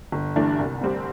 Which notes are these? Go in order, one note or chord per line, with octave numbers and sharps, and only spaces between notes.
G1
G2 E3 A3 D4
C2
C3 G3 C4 G4